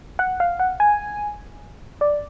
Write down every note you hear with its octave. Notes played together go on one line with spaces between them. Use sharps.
F#5
F5
F#5
G#5
D5